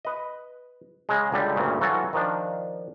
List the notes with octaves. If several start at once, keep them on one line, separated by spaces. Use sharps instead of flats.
B4 D#5
C#3 G#3
C#2 D3 G3
D2 G2 A#2 C#3
E3 F#3 F4 F#4 A4
D#3 F3 D4